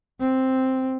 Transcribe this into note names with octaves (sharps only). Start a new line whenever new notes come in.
C4